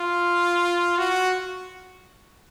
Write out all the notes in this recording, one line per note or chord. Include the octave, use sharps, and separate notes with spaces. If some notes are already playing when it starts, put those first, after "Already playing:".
Already playing: F4
F#4